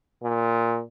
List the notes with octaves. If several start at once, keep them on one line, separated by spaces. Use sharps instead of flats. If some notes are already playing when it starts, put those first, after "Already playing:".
A#2